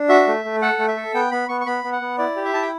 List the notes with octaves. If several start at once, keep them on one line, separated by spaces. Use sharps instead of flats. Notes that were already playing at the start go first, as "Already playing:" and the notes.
Already playing: D4
F#4 E5
A3
A3
A4 F#5
A3
E5
A4
B3 G5
B3 B5
B3 C#6
C#6
B3 B5
B3
F#5
B3
E4 D5
G4
E5
E4 A5
G5